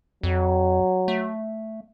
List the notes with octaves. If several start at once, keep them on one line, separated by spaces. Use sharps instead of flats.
F2 F#3
A3